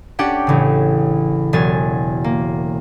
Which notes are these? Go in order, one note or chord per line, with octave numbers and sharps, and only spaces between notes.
C#4 D4 G4 F#5 G5
A1 C#3
E1 F#3 G#5 A6
A#3